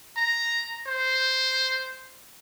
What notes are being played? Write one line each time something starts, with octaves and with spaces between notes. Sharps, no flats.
A#5
C5